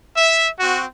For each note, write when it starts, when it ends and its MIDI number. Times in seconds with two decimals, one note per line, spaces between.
0.16 0.48 76
0.60 0.83 60
0.60 0.83 66